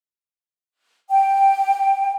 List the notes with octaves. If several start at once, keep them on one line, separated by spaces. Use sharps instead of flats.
G5